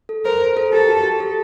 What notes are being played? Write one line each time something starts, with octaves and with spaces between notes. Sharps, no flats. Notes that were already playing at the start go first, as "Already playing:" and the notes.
A4
A#4 C5
C5
A4
G4 A4
F#4
G4
A4